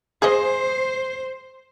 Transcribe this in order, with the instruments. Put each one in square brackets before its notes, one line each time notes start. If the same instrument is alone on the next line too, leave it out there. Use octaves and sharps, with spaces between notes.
[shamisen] G#4 D#5 [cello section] C5